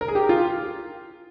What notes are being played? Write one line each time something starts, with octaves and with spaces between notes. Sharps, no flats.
A#4
G#4
G4
F4